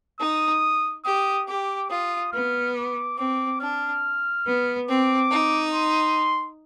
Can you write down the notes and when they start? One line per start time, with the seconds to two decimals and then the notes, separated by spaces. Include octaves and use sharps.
0.20 D#4 D#6
1.05 G4 D#6
1.48 G4 D6
1.90 F4 D#6
2.32 B3 F6
2.76 D6
3.18 C4 D6
3.61 D4 F6
4.46 B3
4.88 C4 D6
5.31 D#4
5.73 C6